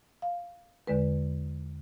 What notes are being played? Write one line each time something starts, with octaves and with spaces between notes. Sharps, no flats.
F5
E2 D3 G#3 B4